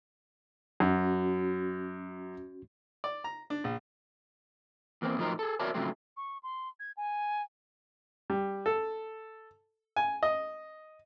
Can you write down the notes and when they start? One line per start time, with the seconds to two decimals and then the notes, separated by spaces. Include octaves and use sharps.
0.80 F#2 C#4 F#4
3.04 D5
3.24 A#5
3.50 D4
3.64 A#1
5.02 E2 A#3 C4
5.18 A2 F3 F#3 D#4 A#4 C5
5.39 G#4 A4
5.59 F#4 A#4 C#5 D5 E5 A5
5.74 G#2 C#3 F3 F#3 A3 C4
6.17 C#6
6.43 C6
6.80 G#6
6.97 G#5
8.30 G3
8.66 A4
9.96 G#5
10.23 D#5